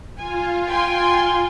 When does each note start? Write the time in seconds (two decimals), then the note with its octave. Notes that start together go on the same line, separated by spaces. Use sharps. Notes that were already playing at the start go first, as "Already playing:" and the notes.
0.18 F4 G#5
0.66 G5 G#5 C6